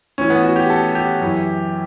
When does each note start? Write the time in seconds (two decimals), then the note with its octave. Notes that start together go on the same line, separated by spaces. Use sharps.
0.18 A2 E3 C#4
0.30 B3
0.43 F#4
0.56 G4
0.70 A4
0.95 G4
1.21 F#2 E3